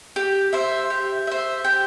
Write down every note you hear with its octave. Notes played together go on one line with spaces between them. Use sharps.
G4
C5 E5
G4
C5 E5
G4